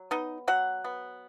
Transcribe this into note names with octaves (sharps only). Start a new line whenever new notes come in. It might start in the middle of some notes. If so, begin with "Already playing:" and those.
Already playing: F#3
B3 D#4 D#5
F#3 F#4 F#5
B3